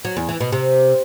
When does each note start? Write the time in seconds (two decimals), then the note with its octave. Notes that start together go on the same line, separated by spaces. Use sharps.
0.05 F#3
0.17 E2
0.29 E3
0.41 B2
0.52 C3